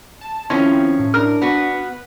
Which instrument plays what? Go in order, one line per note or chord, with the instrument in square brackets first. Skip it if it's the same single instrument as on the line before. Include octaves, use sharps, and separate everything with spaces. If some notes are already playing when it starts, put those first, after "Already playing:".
[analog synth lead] A5
[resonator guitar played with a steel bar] D#3 F3 [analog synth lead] C4 [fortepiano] C#4 [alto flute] E4
[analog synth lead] A2
[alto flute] D4 [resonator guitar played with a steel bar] A#4 [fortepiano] F6
[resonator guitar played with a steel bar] B3 F#4 [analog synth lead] B4